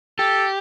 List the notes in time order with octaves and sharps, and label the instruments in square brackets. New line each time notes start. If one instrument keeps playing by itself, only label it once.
[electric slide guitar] G4 [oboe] A4